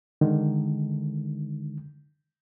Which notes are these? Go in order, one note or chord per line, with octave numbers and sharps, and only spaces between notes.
D3 D#3 G#3 D#4